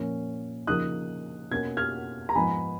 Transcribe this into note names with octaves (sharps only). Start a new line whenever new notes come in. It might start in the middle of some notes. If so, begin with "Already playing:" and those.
Already playing: A#2 F3 A#3 C#4
C#3 F3 A#3 D#4 D#6 F#6
B2 A#3 C#4 G#6
F6 G#6
A#5
G#2 F3 B3 D#4 G#5 B5